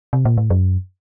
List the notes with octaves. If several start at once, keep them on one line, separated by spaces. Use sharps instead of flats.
C3
A#2
A2
F#2